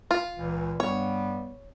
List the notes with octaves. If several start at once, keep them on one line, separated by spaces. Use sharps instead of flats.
F4
C#2 A#2 E3
G2 G3 B3 C#5